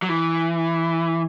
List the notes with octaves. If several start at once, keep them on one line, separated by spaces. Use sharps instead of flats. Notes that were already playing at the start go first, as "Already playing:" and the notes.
F#3
E3